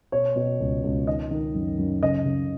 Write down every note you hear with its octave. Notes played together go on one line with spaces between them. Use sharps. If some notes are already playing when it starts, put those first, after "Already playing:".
B2 C#5
B2
C#2
C#2
D#3 D#5
D#3
F#2
F#2
C#3 D#5
C#3